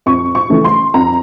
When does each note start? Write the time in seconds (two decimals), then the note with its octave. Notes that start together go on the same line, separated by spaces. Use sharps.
0.06 F2 C#6
0.35 C#6
0.50 C#3 E3 A3
0.64 C6
0.94 F2 A#5